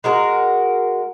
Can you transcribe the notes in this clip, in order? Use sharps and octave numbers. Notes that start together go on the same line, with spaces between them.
G#3 F#4 A#4